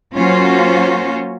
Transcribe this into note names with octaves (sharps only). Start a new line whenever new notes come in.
F#3 A#3 C#4 F4 F#4 C5